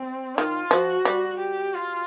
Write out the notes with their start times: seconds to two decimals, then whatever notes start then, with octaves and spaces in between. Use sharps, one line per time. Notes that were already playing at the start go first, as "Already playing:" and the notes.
Already playing: C4
0.37 D#3 F4
0.71 F3 F#4
1.05 G3
1.39 G4
1.74 F4